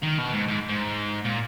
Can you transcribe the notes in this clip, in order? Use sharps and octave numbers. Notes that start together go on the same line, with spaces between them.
D#3
B2
G#2
G#2
G#2
A#2